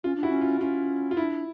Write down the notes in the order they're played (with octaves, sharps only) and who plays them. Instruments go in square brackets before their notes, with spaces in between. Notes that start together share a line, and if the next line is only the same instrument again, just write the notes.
[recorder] C#4 [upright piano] F4
[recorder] D4
[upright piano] E4 F#4
[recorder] C#4
[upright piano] F4
[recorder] C#4 [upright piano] F4
[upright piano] F4
[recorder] D#4 [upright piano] E4
[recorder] D4